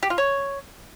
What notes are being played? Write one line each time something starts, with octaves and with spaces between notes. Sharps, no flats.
G4
F4
C#5